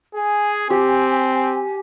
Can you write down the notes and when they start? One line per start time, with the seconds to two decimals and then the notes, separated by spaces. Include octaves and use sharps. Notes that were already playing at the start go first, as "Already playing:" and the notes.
0.15 G#4 G#5
0.70 C4 G4